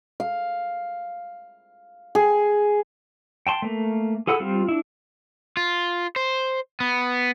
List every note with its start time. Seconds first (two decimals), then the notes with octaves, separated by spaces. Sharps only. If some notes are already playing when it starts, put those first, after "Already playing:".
0.20 F5
2.15 G#4
3.47 G5 A5 C6
3.62 A3 A#3
4.27 G#4 A4 F#5 B5 E6
4.40 G3 C4 F4
4.69 D4 E4
5.57 F4
6.16 C5
6.80 B3